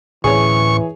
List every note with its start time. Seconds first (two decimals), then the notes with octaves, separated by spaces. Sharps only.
0.24 D1 A2 E3 C#4 G#4 C#5 C#6